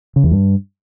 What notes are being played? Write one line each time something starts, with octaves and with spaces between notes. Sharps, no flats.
C#3
E2
G2